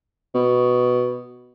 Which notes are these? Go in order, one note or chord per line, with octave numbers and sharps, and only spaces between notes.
B2